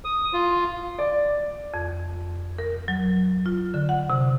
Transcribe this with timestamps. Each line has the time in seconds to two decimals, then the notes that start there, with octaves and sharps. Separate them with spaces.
0.05 D#6
0.33 F4
0.99 D5
1.74 F2
2.58 A#4
2.88 F#3
3.46 F4
3.74 D3
3.89 F#5
4.10 C3